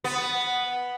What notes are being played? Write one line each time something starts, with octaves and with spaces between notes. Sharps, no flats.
B3